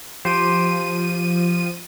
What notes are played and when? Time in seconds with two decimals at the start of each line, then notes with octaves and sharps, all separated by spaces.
0.25 F3 G4 C5 D#7